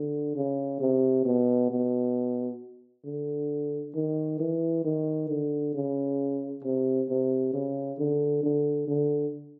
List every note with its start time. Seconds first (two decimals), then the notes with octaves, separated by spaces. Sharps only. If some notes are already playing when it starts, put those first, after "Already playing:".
Already playing: D3
0.35 C#3
0.80 C3
1.25 B2
1.70 B2
3.05 D3
3.94 D#3
4.39 E3
4.84 D#3
5.29 D3
5.74 C#3
6.63 C3
7.09 C3
7.53 C#3
7.99 D3
8.43 D3
8.88 D3